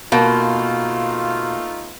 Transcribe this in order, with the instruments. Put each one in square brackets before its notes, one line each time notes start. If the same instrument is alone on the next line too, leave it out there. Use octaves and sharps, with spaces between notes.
[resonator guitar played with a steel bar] B2 [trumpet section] A3 D#4 F4 [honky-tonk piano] A#3